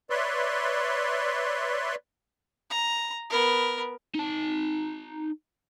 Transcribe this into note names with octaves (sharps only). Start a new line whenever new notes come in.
B4 C#5 D5 E5 C6
A#5
B3 A#4
D#4 A5